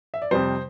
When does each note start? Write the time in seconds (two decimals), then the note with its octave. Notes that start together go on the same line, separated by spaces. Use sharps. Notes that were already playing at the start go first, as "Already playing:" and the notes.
0.14 E5
0.22 D5
0.31 F2 C3 G3 C5